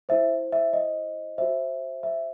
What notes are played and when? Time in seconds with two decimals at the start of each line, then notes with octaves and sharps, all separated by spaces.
0.09 E4 C5 E5
0.52 E5
0.73 D#5
1.38 F#4 C5 E5
2.03 E5